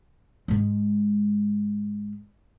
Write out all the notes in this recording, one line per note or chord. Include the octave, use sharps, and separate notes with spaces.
G#2 G#3